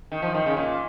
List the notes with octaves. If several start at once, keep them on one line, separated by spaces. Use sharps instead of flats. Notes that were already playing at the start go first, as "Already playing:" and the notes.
D#3
F3
D#3
C#3
A#2